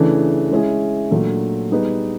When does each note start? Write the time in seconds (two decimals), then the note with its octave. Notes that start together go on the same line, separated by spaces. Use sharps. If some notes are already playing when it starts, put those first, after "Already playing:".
Already playing: C#3 E3 A3 D4
0.51 G#3 C#4 E4 G#4
1.11 A#2 F#3 A3 D4
1.71 G3 B3 D#4 G#4 B4